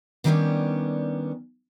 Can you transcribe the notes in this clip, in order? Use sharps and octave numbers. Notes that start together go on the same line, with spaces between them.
D3 D#3 G3 B3 C#4 D4